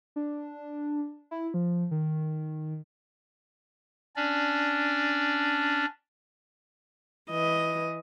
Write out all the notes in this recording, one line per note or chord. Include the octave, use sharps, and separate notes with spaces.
D4
E4
F3
D#3
C#4 D4 D5
E3 D#5